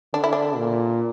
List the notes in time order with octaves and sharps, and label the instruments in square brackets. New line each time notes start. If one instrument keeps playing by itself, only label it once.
[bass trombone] D3 [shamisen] D4
[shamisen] E4
D4
[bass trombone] A#2